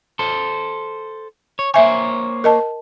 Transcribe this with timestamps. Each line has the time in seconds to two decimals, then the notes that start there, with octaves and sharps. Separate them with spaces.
0.19 A4 C5
1.59 C#5
1.74 A#3 C5 C#5 E5 G#5
2.44 A#4 D#5 A5